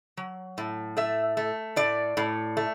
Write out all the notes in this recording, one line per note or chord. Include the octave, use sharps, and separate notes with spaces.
F#3
A2
A3 E5
A3
A2 D5
A2
A3